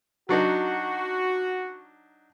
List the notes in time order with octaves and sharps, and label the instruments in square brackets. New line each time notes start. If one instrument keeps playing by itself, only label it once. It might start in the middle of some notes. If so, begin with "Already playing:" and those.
[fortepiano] F#3 D4 D#4 [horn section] F#4